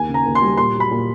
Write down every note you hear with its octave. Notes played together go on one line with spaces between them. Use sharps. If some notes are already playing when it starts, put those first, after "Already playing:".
Already playing: D#2 G#5
C#3
A#5
D#2
C6
G3
A#2 C6
F#3
B5
A#2